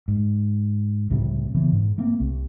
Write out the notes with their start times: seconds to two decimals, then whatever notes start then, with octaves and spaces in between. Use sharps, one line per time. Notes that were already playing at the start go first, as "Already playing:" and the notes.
0.08 G#2
1.10 C#2 A2 C3 G3
1.55 C#3 E3 B3
1.72 G#2
1.98 A3 A#3 C4
2.20 C2